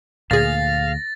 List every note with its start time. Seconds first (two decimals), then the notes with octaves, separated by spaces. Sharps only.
0.31 D2 A#2 G#4 F5 A6 A#6